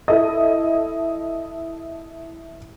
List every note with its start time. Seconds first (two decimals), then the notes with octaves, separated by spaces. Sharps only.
0.08 E4 A4 D#5